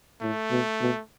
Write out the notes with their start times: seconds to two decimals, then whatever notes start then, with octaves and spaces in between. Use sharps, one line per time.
0.22 A2 A3
0.51 B2
0.81 B2